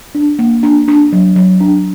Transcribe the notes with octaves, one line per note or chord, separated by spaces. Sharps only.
D4
A#3
D4
D4
F#3
F#3
D4